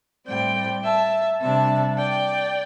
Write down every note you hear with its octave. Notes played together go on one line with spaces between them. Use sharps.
A2 G3 C4 D5 G5
E5 A5
C3 G3 D4 E5 A5
D5 G5